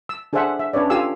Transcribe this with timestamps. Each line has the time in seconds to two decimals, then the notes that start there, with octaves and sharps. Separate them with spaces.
0.09 E6
0.33 D4 G#4 A4 C5 E5 F#5
0.59 E5
0.73 C#4 D4 B4 C#5 D5
0.90 F4 G4 A4 F5 G#5 E6